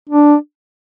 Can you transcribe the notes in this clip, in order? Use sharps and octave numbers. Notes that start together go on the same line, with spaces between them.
D4